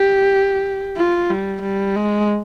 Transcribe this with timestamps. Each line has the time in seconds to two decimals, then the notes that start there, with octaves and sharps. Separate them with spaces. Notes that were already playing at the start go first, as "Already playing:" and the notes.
Already playing: G4
0.97 F4
1.30 G3
1.63 G3
1.96 G#3